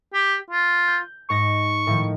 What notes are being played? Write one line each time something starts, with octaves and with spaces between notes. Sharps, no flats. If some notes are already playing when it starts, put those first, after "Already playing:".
G4
F4
G6
G#2 C#6 A#6
A2 D#3 F3